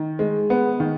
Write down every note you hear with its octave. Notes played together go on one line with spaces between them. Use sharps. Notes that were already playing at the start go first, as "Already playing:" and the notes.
Already playing: D#3
G#3
B3
D#3